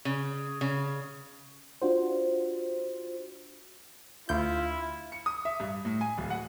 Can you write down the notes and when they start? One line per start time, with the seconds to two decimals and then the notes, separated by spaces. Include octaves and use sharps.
0.05 C#3
0.61 C#3
1.82 D4 F4 F#4 C5
4.29 D2 E4 F4 G6
5.12 C#7
5.26 D#6
5.45 E5
5.60 G2
5.85 A2
6.01 G#5
6.18 D1
6.30 F#5